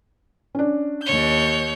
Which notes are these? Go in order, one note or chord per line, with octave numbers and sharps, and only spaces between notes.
C#4 D4
D#2 C#5 G6